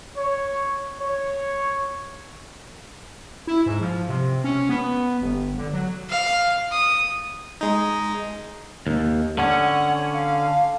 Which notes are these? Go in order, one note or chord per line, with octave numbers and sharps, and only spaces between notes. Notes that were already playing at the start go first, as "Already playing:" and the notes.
C#5
C#5
E4
G#2
F3
C3
C#4
B3
G1
D3
F#3
F5
D#6
G#3 D#4
D#2
D3 C#4 F#5
F5